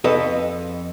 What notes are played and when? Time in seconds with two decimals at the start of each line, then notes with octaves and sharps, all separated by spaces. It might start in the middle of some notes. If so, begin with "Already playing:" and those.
0.04 F2 A4 B4 D#5